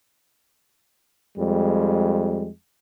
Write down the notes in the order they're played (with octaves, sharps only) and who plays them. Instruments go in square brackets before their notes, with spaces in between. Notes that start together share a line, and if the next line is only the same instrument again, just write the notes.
[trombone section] F2 G3 G#3